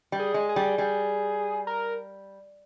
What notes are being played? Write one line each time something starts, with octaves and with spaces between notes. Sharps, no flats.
G3
G#4
G#3
G#4
G3
G3 G#4
A#4